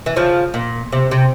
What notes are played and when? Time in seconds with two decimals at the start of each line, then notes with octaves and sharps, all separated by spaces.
0.06 E3
0.16 C#3 F3
0.54 A#2
0.92 C3
1.11 C3